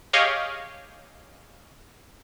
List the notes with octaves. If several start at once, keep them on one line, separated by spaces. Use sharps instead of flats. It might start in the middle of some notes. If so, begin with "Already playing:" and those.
G4 G#4 C#5 D#5 F5